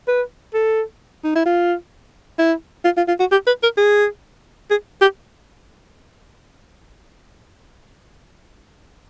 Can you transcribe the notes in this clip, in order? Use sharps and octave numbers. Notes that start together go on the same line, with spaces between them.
B4
A4
D#4
E4
F4
E4
F4
F4
F4
F#4
G4
B4
A#4
G#4
G#4
G4